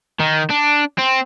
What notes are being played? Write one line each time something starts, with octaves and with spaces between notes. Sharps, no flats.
D#3
D4
C4